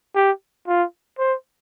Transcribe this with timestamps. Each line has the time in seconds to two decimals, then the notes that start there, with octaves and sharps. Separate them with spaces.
0.15 G4
0.68 F4
1.19 C5